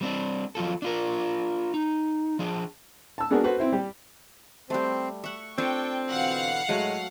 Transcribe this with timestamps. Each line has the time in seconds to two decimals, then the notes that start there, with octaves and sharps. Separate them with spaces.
0.01 G3 C4 D4
0.55 F3 F#3 F4 A4
0.82 D4 F4 A#4
1.74 D#4
2.39 F3 D4 G#4
3.18 A5 E6
3.30 G#3 B3 D4 F#4 G#4 A#4
3.44 F#4 A4 B4 C5
3.58 C4 E4 C5
3.72 G3 G4
4.70 G3 A3 C4 C5
5.24 E5 F#5 C#6
5.58 C4 D4 F4 A4 G5
6.10 B2 D3 E3 F5 F#5
6.69 A2 F#3 G#3 A3